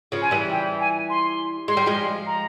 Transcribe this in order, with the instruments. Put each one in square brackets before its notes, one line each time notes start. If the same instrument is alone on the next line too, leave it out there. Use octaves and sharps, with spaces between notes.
[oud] C#3 F3
[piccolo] G#5
[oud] E3 G3
[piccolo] G5
G#5
C6
[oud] G#3 [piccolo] C6
[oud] G3
F3 G#3
[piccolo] A#5